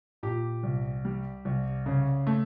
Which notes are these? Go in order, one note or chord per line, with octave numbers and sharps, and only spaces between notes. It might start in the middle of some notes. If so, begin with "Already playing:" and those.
A#2 G4
C2
G3
C2
C#3
A3